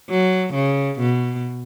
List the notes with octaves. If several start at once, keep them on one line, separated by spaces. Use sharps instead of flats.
F#3
C#3
B2